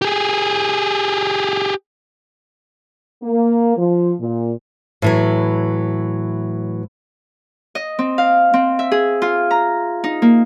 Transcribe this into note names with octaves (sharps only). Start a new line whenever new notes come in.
G4 G#4
A#3
F3
A#2
A2 E3 F#3
D#5
C4
F5
C4
E5
G#4
F4
A#5
D#4
A#3